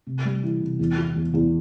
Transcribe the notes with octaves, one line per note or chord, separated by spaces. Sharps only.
C3
G3
E3
C3
E2
F4
E2
E2